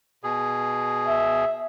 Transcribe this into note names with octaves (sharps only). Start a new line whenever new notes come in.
B2 G#4
E5